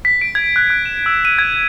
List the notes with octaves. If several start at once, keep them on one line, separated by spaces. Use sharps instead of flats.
B6
D7
G#6
F#6
F#6
E7
E6
D#7
G#6